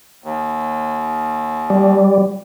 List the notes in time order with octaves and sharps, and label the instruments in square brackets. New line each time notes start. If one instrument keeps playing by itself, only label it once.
[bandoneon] D#2
[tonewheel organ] G3